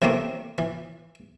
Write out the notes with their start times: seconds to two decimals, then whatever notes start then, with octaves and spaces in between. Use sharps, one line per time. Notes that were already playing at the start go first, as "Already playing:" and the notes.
0.02 C3 E3 G3 A3 A#3 C4
0.58 E3